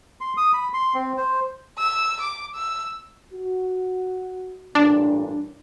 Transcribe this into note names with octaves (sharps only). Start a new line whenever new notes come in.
C6
D#6
B5
C6
C4
C5
E6
D6
E6
F#4
A1 G2 A#2 D4